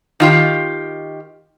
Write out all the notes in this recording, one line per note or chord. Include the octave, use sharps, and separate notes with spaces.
D#3 F4 G4